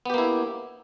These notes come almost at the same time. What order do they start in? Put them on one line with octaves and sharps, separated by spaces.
B3 G4 A#3 E4